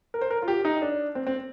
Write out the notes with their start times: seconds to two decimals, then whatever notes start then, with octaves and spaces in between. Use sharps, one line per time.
0.14 A#4
0.21 C5
0.30 A#4
0.42 F4
0.48 G4
0.65 D#4
0.82 D4
1.15 C4
1.27 C4